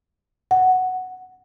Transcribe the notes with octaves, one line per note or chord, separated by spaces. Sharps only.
F#5